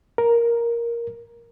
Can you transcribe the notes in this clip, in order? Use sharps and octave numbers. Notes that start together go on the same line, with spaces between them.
A#4